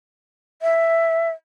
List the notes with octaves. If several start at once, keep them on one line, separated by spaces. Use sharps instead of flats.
E5